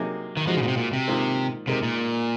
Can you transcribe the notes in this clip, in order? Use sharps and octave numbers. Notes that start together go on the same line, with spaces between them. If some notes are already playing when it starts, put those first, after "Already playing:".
Already playing: C3 F#3 A#3 D#4 G#4
D#3
F3 G#3 D#4 F#4 C5
C#3
A#2
C3
A#2
C3
G#2 D#3 A#3 F4 C5
C3 G#3 D#4 A#4
A#2